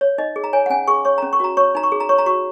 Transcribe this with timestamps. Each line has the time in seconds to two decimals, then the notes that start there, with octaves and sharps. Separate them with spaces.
0.01 C#5
0.18 D#4 D#5
0.36 G#4
0.44 A#5
0.53 C#5 G#5
0.66 F#5
0.70 C#4 G#5
0.88 G#4 C#6
1.05 C#5 C#6
1.18 A#5
1.22 C#4
1.33 C#6
1.40 F#4 A#5
1.57 C#5 C#6
1.75 D#4 A#5
1.83 C#6
1.92 G#4
2.00 A#5
2.09 C#5 C#6
2.18 A#5
2.26 F#4 C#6